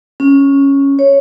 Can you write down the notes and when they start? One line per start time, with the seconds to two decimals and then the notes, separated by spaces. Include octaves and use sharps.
0.20 C#4
0.99 C#5